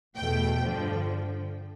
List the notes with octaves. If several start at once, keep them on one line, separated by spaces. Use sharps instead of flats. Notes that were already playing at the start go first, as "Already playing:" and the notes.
E2 B2 A3 G5
G2 D3 F3